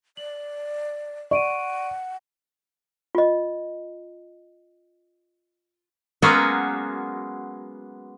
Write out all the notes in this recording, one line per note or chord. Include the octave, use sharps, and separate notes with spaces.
D5 F#7
D5 F#5 C#6 D7 D#7
F4 D#5
F#3 G#3 A#3 B3 C#4 F#4